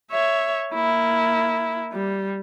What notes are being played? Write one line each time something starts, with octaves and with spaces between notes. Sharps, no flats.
C#5 E5
A#3 E4
G3